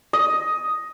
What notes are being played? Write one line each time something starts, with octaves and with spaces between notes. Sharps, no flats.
D#5